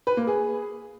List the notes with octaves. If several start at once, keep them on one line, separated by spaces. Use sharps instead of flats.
B4
A#3
G#4